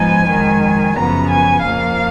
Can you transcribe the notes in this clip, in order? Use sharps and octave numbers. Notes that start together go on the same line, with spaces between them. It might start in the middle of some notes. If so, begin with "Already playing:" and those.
Already playing: G#2 F3 B3 D#4 G#5
F2 D#3 G#3
F#2 C#3 F3 B3 A#5
G#5
F2 F3 A#3 F5